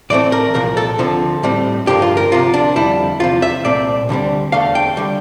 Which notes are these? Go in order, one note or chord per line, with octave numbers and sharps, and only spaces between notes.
A2 E3 A3 C4 D5
A#4
C2 A#2 F3 A#4
A4
D2 D3 F3 C4
A2 G3 C4
G2 D3 F3 A#3 G4
F4
A#4
D2 C3 F3 A#3 F4
D4
F2 D3 G3 E4
E2 C3 F3 F4
E5
C2 A#2 A3 C4 D5
D2 D3 G3 C4
E2 D3 A3 F5
G5
D3 G3